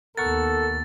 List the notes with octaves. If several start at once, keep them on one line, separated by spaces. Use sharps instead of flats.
D#2 B3 A4 A#4 F#5 C#6 A6